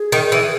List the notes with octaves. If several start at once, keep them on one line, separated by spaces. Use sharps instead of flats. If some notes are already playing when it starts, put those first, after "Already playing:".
Already playing: G#4
D#3
E3